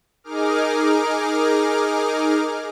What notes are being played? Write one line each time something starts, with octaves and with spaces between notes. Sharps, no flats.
D#4 G#4 A#4 D6 F6